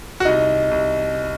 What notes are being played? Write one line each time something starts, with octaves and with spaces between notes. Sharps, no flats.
F#4
C2 D#4
C2